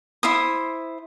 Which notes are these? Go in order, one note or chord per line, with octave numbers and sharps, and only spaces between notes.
E4 C5 D#6